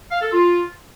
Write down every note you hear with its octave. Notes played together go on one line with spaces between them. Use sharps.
F5
A4
F4